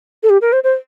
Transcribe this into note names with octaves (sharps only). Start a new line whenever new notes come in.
A4
G4
A#4
C5
C5